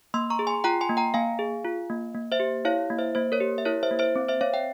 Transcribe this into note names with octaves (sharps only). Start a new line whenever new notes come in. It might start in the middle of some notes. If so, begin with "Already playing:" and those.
A#3 C6 E6
A#5 C#6
G#4
G#5 C6
F4 G5 A#5
G#5 C6
A#3
G5 A#5
A#3 F5 G#5
G#4
F4
A#3
A#3
C5 E5
G4
E4 C#5 F5
A#3
C5 E5
A#3 C5
A#4 C#5
G4
E5
E4 A#4 C#5
C5 E5
A#3
C5 E5
C4
C5 E5
C4 C#5 F5
E5 G5